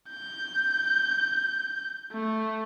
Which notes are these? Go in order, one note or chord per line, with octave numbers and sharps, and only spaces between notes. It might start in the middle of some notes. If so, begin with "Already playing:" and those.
G6
A3